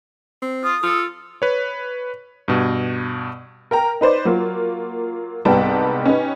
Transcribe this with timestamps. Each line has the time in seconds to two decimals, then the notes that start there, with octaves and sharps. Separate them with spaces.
0.42 C4
0.64 F4 D#6
0.83 F4 A4
1.42 B4 C#5
2.48 G2 B2
3.71 A#4 G5 A#5
4.01 D#4 B4 C5 D5
4.25 F#3 A#3 F4
5.45 C2 G#2 G3 B3 G5 A5
6.06 C#4 D#4 G4 B4